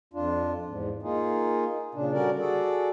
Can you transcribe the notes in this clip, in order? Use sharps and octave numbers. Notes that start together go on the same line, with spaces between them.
F2 D4 F4
E2 G#2
A#3 D#4 F4 G#4
A#2 C#3 D4
D3 G3 C#4 F#4 A#4 D5
F#4 G#4 A4 D5